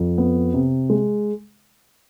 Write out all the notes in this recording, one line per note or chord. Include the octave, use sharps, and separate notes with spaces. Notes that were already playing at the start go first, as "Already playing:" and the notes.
Already playing: F2
B3
C3
G#3